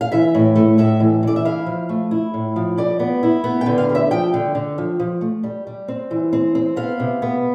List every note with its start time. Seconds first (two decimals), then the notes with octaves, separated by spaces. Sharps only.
0.01 F5
0.12 E3 E5
0.35 A2
0.56 A3
0.78 A2 E5
1.00 E3
1.23 E3 D5
1.36 E5
1.45 E4 F5
1.66 F3
1.89 A3
2.11 E4
2.34 A2
2.56 F3
2.78 G3 D5
2.99 B3
3.23 E4
3.44 B3
3.61 G5
3.66 D3
3.78 F5
3.89 G3
3.95 E5
4.11 F3 G5
4.34 D3
4.55 D3
4.78 F3
5.00 F3
5.21 A3
5.43 G3
5.67 G3
5.88 C4
6.11 E3
6.33 C4
6.55 C4
6.76 B3 F5
7.00 C3
7.22 B3